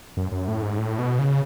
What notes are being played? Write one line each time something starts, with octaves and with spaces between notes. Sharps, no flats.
F#2
F#2
A2
G#2
A2
B2
C#3